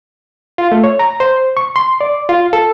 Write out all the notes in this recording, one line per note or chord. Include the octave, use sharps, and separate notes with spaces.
F4
A3
C#5
A#5
C5
C#6
C6
D5
F4
A4